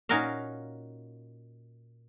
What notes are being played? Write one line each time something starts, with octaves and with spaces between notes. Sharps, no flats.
A#2 C#4 D#4 F#4 A#4 F5